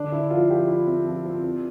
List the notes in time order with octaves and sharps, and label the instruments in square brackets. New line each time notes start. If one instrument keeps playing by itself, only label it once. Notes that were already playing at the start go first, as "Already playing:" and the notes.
Already playing: [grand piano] D3 [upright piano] D4
[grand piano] D3 [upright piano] E4
[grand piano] F3 [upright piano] F4
[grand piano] F3 [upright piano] G4
[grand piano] E4
C4
F3
C4
C4